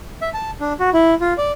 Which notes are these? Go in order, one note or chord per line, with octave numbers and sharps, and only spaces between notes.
E5
A5
D4
F#4
E4
F4
D5